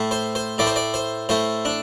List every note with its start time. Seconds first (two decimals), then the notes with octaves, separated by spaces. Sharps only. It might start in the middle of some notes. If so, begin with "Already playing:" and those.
Already playing: A2 A3
0.11 C5
0.35 C5
0.58 A2 A3 D5
0.67 C5
0.76 D5
0.94 C5
1.29 A2 A3 C5
1.65 D4